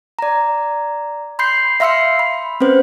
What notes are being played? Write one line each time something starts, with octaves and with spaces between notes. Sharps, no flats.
D5 A#5
B5 C6 G6 C7
E5 F5 C6 E6 C7 C#7
B5
C4 C#4 B4 C5